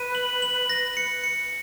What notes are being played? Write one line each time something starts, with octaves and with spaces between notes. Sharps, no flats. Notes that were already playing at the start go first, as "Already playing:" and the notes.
Already playing: B4 D#7
F#7
F#7
A#6
C#7
C#7